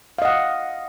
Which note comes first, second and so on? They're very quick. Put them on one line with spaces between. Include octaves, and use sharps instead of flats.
F5 D#5 F#5